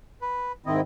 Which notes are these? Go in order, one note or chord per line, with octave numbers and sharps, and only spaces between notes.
B4
G#2 D#3 C4 E4 D#5